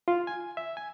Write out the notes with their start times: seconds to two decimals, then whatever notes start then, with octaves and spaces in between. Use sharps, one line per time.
0.08 F4
0.27 G#5
0.57 E5
0.77 G#5